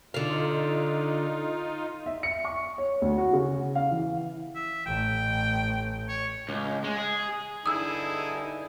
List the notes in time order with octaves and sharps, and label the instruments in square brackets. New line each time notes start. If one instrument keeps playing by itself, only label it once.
[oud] D3 F5 [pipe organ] D#4 F4
[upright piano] E5
C#7
C#6
C#5
D2
F#4
C#3
F5
E3
[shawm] E5
[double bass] A1 [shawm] G5
[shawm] C#5
[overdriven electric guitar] C#2
G#3
G#4
[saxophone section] G2 D3 D#4 [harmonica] E4 G#4 [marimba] D#6 E6